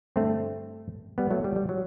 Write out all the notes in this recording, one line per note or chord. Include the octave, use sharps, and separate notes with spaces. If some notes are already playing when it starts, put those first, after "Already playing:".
G2 D3 A3 C4
G3 B3
F#3 A3
G3
G3
F#3